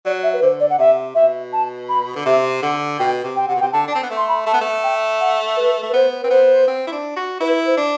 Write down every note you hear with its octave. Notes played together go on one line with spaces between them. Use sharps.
F#3 D5
E5
B4
D3 C5
D5
F#5
C3 E5
B2 E5
A5
B5
D3
C3 E5
D3 F#5
B2 G5
C3
G5
C3 F#5
B2
C3 G5
D3 A5
D4
A5
C4
B3
A3
C6
B5
A3 A5
B3
A3
G5
F#5
B4
A3
B4
B3 C5
C4 B4
B3 C5
C4
E4
D4
F#4
E4 B4
C5
D4